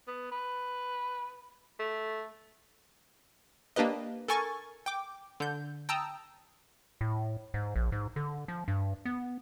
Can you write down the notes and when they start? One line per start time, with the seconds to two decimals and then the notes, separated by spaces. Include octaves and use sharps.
0.07 B3
0.32 B4
1.79 A3
3.76 A#3 D4 G4 B4 D#5
4.28 A4 A#4 G#5 C#6 A6
4.86 G5 D6
5.40 D3 G6
5.89 G5 A5 A#5 D#6 E6
7.01 A2
7.54 G#2
7.76 A#1
7.92 G#2
8.16 D3
8.48 F3
8.68 G2
9.05 B3